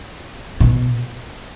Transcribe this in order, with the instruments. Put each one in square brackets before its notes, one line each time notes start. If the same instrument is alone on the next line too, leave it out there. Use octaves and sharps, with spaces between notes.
[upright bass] B2